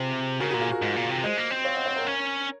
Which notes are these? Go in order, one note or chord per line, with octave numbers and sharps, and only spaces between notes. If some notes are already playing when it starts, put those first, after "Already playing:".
Already playing: C3 F4 G#4
C#3 F#4 A#4
A#2 F#4
F4 G#4
F#4 A#4
G#2
A#2
C3
G#3 C5 D#5
A#3
C4
C#5 F5
D#5 F#5
C#5 F5
A#4 C#5
C#4